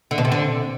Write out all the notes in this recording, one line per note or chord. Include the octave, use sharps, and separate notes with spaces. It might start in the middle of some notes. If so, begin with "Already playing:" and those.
D3
B2
C3
D3